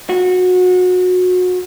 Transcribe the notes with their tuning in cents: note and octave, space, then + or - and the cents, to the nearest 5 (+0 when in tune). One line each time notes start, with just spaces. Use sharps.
F#4 -25